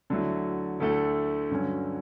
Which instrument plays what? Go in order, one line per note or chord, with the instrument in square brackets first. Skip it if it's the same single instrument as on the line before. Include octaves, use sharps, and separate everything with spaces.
[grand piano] D2 D3 F#3 A3 E4
D2 D3 A3 E4 A4
G2 D3 F#3 C#4